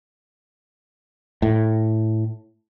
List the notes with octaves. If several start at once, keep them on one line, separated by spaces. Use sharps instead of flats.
A2